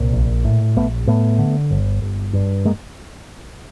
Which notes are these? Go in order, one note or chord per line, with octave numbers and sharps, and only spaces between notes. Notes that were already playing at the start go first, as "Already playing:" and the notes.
Already playing: C2 A#2
A#1
A2
A#1 A3 B3
A2 A3 B3
D3
G1
G1
G2
G#3 A#3